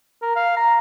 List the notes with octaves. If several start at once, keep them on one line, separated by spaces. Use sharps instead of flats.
A#4
F5
A#5